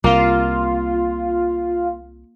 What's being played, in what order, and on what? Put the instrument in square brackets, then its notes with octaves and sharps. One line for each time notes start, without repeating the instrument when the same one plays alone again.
[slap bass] C2 C3 [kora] A#3 [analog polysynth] F4